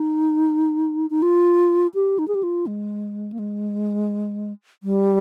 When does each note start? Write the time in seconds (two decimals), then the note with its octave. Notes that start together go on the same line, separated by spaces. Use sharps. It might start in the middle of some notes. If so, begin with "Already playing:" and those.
Already playing: D#4
1.10 D#4
1.22 F4
1.94 G4
2.19 D#4
2.28 G#4
2.35 G4
2.43 F4
2.67 G#3
3.32 A#3
3.39 G#3
4.83 G3